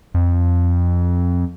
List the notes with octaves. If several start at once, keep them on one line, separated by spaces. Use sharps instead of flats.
F2